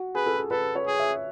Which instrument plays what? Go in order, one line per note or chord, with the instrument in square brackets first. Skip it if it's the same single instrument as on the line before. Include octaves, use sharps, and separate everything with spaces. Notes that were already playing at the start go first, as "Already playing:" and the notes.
Already playing: [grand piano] F#4
[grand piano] G#4 [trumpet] B4
[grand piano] A4
G#4
[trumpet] A4 [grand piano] B4
[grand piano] C#5
[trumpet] G#4
[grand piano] E5